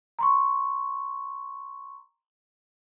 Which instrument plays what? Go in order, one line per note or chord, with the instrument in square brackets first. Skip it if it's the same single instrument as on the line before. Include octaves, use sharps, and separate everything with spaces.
[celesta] A#5 C6 C#6